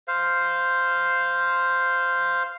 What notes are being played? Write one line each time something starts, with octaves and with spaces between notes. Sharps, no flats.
C5 F5